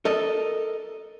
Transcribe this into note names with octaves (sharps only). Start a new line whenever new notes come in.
A4 A#4 D#5